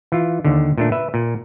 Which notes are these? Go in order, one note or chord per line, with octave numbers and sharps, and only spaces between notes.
E3 F4
D#2 D3
A#2 A3 D4
B4 E5
A#2